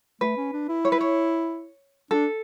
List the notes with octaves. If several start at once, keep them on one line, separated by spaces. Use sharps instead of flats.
A3 B4
C#4
D4
E4
C#5
B4
C#5
D4 A4